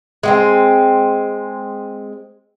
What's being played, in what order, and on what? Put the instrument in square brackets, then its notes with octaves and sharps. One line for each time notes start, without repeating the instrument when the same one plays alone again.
[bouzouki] G#3 B3 C4